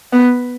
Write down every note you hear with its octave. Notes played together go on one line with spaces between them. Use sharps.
B3